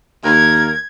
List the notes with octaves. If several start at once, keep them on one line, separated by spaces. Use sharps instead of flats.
D#2 A#4 G#6